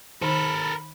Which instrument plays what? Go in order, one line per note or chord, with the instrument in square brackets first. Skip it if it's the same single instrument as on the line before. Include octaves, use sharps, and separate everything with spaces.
[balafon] D#3 D#4 [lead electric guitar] A4 A#4 [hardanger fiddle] B5